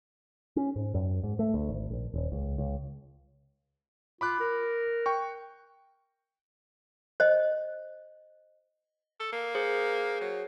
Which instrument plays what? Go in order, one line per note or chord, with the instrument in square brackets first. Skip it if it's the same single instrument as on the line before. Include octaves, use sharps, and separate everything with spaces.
[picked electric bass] C#4
G#2
F#2
G#2
A3
D2
G#1
A#1
D#1
C#2
C#2
[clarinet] F4 [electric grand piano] B5 D6 F#6
[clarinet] A#4
[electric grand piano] G5 C#6
[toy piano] C5 D#5
[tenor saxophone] A4
A#3
[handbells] G#4 C5
[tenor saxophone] F#3